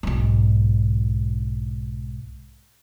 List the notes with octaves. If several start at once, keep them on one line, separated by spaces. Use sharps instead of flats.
B1 G#2